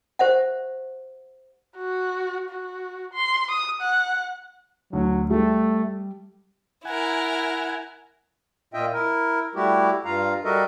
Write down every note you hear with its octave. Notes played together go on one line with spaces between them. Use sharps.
G4 C5 E5 F#5
F#4
F#4
C6
D#6
F#5
D2 F#3
G3 A3
E4 A#4 F#5 G#5
A#2 F4 D#5 E5 G5
E4 A#4
G3 A3 E4 F#4 G4
G2 F4 F5 A#5
G3 F#4 A4 A#4 D#5 E5